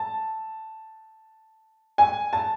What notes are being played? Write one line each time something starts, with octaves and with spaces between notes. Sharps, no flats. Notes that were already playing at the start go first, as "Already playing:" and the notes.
Already playing: A5
G#5
A5